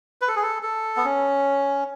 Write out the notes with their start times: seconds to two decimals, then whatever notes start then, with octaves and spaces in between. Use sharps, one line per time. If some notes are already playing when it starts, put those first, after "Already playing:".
0.21 B4
0.28 A4
0.36 G#4
0.42 A4
0.63 A4
0.97 B3
1.05 C#4